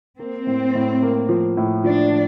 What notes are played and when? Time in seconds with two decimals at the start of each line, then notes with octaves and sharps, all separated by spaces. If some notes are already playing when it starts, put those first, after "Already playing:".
0.19 A#3 C4
0.46 A2
0.75 A2
1.02 A#3
1.29 F3
1.57 A2
1.84 F3 D4
2.11 F3